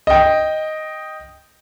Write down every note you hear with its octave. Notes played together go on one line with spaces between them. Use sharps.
D#5 G5